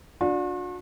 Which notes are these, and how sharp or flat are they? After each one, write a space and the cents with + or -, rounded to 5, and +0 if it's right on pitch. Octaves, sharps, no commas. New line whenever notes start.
D4 +0 F#4 -45